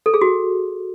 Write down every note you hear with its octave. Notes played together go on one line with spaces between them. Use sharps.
A4
G#4
F#4